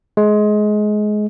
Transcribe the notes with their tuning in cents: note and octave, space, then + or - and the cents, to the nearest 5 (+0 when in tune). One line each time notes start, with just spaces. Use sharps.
G#3 +20